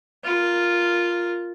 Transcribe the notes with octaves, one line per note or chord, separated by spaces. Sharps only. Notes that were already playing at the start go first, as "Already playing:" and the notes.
F4 A#4